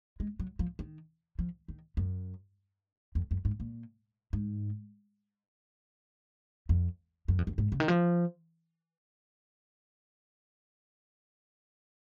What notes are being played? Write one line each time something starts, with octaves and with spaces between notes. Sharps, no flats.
G#3
F#3
F3
D#3
F3
D#3
F#2
F2
F#2
G#2
A#2
G#2
F2
F#2
F2
F#2
G#2
C#3
D#3
F3